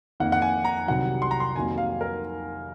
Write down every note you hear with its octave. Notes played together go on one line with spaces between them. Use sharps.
F2 D#3 A#3 F#5
F#5
G#5
A#5
C2 C3 D#3 F#3 F#5
C6
A#5
C6
F2 D#3 F#3 A#3 G#5
F5
A#4